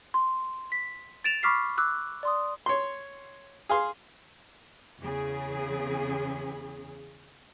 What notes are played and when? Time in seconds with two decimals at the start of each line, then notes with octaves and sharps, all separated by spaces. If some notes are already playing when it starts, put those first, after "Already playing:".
0.14 C6
0.72 B6
1.24 A6 D7 E7 F7
1.43 B5 C#6 D6 F6 B6 C7
1.78 D6 E6 F#6
2.23 D5 C6 D#6
2.66 C#5 C6
3.69 G#4 F5 C6
5.00 E2 C#3 G#4